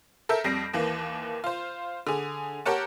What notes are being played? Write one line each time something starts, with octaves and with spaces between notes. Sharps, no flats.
A4 A#4 E5 G6
F2 G3 A#6 C7 D7
D#2 E3 A#3
F4 C5
D3 G#4
G4 A#4 C#5 F#5 A5